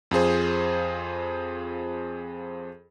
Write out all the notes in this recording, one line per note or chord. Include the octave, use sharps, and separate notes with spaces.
F2 F4 G#4 C5